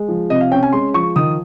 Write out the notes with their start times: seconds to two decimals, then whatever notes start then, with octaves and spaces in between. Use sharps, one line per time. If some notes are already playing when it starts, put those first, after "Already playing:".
Already playing: G#3
0.08 F3
0.30 C3 D#5
0.41 F5
0.51 C#4 G5
0.63 G#5
0.73 G#3 C6
0.94 F3 C#6
1.16 D#3 D#6